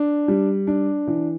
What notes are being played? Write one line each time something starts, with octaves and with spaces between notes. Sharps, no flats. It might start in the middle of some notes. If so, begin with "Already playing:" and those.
Already playing: D4
G3
D4
E3